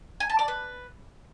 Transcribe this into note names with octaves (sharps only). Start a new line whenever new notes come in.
G#5
A5
D5
B4